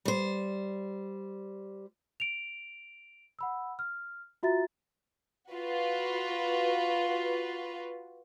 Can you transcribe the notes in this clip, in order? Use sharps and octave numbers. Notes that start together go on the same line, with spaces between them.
G3 C5
D7 F7
F#5 B5 E6
F6
F4 F#4 E5 A#5 A6
F4 F#4 B4